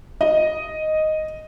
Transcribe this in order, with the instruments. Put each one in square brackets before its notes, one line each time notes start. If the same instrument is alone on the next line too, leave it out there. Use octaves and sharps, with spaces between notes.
[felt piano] D#5